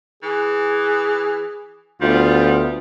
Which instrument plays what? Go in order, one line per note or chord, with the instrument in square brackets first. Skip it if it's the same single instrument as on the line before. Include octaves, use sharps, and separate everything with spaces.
[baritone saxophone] E3 [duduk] G#4
[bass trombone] D2 [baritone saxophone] G3 [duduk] B3 [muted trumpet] F4